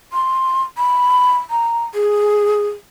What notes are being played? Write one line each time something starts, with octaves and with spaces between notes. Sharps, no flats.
C6
B5
A#5
G#4